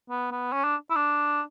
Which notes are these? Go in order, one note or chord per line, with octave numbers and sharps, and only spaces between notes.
B3
B3
C#4
D4
E4
D4